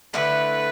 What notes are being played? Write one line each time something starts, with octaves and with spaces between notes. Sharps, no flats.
D3 A3 E4 B4